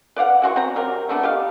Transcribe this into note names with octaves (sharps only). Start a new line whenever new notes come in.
B4 D5 F5 F#5
E3 F#4 C6 C#6
C4 A#5
C3 F#3 A#4
A3 B3 D4
G4 D#5 F5